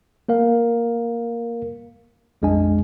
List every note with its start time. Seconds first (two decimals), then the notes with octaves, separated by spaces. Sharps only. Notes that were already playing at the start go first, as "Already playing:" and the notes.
0.28 A#3 A#4 F5
2.42 A#1 F2 G#3 D4 D#5 G#5